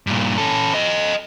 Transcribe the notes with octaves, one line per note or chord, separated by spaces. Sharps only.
G2 A#2
C#4 A4
A4 D#5